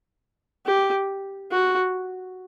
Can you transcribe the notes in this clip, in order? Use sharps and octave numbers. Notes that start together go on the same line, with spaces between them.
G4
F#4